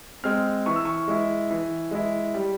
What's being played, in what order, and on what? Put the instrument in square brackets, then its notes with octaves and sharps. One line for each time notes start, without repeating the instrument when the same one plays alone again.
[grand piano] G#3 C4 F6
E3 C#6
E6
C#6
G#3 E4
E3
G#3 E4
G3